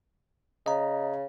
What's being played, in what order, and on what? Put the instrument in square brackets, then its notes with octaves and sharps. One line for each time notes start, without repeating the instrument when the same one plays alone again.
[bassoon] C#3 [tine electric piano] D#5 A#5